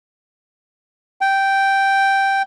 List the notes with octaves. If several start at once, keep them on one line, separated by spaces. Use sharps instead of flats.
G5